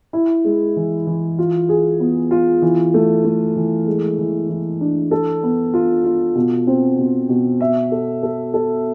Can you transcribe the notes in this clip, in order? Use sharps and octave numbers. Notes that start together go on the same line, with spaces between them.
E4
G#3
E3
E3
F4
G#4
B3
F4
E3
A3
A3
E3
G#3
E3
E3
D4
A4
B3
F4
F4
B2
C4
B2
B2
E5
A4
A4
A4